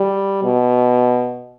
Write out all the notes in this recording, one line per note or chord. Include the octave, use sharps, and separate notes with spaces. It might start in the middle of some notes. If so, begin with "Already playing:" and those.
Already playing: G3
B2